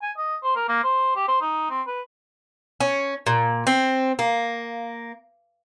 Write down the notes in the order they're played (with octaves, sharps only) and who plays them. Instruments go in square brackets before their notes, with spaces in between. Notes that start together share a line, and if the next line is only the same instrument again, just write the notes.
[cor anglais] G#5
D#5
C5
A#4
A#3
C5
G4
C5
D#4
C4
B4
[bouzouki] C#4
A#2
C4
A#3